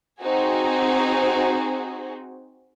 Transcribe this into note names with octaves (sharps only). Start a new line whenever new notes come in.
C4 D#4 F#4 G#4